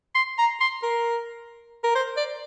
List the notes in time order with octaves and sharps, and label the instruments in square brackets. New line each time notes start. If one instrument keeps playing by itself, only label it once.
[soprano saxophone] C6
A#5
C6
A#4
A#4
C5
D5